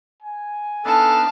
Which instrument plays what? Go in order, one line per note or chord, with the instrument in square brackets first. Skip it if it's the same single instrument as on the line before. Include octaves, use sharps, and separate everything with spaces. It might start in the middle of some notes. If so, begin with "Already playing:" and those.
[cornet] G#5
[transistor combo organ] B3 D4 D#4 [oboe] A4 [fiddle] F5 A5